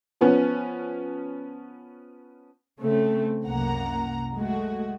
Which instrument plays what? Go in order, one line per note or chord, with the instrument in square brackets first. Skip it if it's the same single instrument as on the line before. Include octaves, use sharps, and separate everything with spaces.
[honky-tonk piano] F3 B3 C#4
[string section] C#3 A3 C4
C2 F#2 A#3 F#5 A#5
G#3 A3 F#4